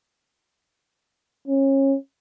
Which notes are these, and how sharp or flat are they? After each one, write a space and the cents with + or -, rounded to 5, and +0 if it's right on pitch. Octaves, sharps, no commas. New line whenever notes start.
C#4 -30